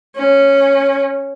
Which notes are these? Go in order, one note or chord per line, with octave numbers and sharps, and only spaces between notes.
C#4